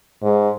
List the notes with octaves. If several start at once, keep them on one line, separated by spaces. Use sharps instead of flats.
G#2